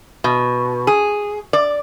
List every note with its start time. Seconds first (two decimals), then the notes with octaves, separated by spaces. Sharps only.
0.24 B2
0.87 G#4
1.53 D5